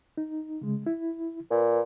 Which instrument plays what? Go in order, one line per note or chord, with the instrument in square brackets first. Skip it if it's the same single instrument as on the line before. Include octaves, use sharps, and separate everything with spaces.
[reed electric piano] D#4
C#3 G#3
E4
[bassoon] A#2 [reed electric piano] B4